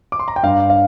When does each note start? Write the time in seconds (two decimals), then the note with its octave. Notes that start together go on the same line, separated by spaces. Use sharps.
0.12 D6
0.19 C6
0.28 A#5
0.36 G5
0.43 G2 F5
0.70 F5